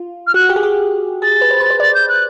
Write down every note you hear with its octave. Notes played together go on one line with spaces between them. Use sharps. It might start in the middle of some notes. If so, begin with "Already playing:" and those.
Already playing: F4
F6
F#4 F#6
G4
G#4
G4
G#4 A6
B4
C5
B4
C5
D5 A6
G6
F#6